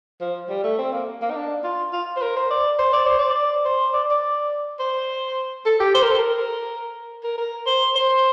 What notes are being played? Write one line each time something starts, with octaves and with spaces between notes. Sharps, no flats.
F3
G3
A3
C4
A#3
A#3
D#4
D4
F4
F4
C5
A#4
C5
D5
C5
D5
C5
D5
C5
D5
D5
C5
A4
G4
C5
A#4
A4
A#4
A#4
A#4
C5
C5